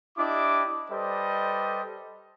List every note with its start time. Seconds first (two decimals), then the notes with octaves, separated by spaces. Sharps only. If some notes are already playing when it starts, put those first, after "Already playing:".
0.18 D4 E4 G4 D#5 D6
0.90 G3 A4 B4 C5 D5 D#5